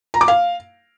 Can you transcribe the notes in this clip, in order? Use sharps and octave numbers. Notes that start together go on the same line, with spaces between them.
A#5
D6
F5